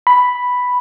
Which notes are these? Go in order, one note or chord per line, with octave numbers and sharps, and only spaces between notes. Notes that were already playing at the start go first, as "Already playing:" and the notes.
B5